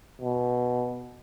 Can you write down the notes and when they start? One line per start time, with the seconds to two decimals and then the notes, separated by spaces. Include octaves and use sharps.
0.22 B2